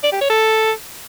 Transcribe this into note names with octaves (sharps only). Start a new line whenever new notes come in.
D5
G4
C#5
A4